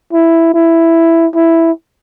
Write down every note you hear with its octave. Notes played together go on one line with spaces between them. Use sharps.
E4
E4
E4